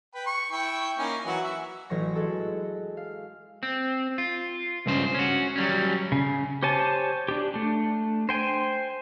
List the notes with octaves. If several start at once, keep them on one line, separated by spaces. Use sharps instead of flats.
B4 G5 B5
C#6
E4 G5 C#6
A#3 C#4 D#4
E3 F#3 F#4
E5
A1 E3 F#3 C#6 A#6
G#3 F#4 A4
F5
C4
F4
C#2 G2 C#3 C5
C#4 F#4
F#3 G3 C#4
C#3
G4 C5 C#5 G#5 A5
D4 G4
A3 D4
C5 G5 G#5